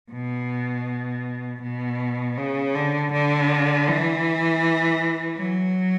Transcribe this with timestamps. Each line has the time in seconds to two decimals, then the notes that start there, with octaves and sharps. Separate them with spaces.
0.12 B2
1.62 B2
2.38 C#3
2.75 D3
3.12 D3
3.88 E3
5.38 F#3